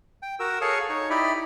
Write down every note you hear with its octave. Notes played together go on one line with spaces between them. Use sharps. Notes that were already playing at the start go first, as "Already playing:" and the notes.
G5
F#4 A#4 E6
G#4 A4 C#5 F5 C#6 D#6
D#4 C#5
D#4 E4 G4 D5 D#5 B5